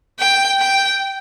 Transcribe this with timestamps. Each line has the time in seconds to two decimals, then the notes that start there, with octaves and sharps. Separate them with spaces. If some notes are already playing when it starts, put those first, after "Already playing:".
0.19 G5
0.60 G5